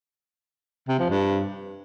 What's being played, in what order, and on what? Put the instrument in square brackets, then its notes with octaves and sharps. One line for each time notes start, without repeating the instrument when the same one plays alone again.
[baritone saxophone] C3
F3
G2